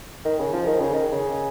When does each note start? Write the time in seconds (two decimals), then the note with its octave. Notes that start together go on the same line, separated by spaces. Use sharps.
0.25 D#3
0.39 C#3
0.53 F3
0.67 D#3
0.80 C#3
0.93 D#3
1.12 C#3